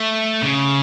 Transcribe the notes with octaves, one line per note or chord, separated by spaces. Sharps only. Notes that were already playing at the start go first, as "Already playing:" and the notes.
Already playing: A3
C#3